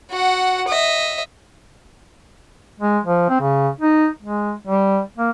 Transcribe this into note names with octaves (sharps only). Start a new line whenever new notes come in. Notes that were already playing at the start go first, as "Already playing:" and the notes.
F#4 F#5
D#5 E5
G#3
F3
C4
C#3
D#4
G#3
G3
A#3